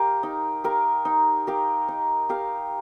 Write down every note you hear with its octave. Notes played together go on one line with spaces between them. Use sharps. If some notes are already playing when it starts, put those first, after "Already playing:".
Already playing: G4 A#4 F5
D#4
G4 A#4 F5
D#4
G4 A#4 F5
D#4
G4 A#4 F5